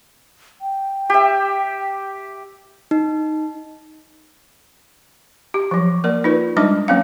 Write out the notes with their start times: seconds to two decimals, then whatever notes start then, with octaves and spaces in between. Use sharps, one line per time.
0.61 G5
1.10 G4 E5
2.91 D#4
5.54 G4
5.71 F3 F#3
6.04 A#3 A#4 D5
6.24 D#4 F4 B4
6.57 G3 G#3 D4 D#4 D6
6.88 F#3 A#3 C4 C#4 F5